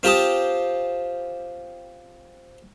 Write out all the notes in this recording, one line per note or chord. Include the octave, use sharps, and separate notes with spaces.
C4 F4 G4 A5 D#6